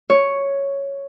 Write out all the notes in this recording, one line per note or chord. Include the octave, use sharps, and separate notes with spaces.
C#5